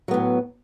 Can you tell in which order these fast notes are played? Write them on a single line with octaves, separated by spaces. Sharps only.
F#3 B3 A2